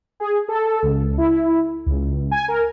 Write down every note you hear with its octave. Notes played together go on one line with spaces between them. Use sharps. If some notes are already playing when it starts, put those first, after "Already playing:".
G#4
A4
C#2
E4
C#2
G#5
A#4